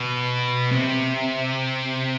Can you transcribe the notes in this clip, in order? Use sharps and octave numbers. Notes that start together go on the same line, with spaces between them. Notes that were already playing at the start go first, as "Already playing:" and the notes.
Already playing: B2
C3